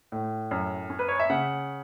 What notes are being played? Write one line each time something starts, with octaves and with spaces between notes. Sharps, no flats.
A2
F#2
C#4
B4
C#5
E5
C#3 F#5